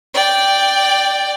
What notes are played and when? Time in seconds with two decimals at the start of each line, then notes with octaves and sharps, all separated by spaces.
0.14 D5 G5